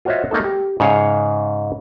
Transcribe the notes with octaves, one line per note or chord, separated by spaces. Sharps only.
F4 F#4 C5 C#5 D#5 E5
A3 A#3 D#4 A4
G4
G#2 C#3 C#5 F5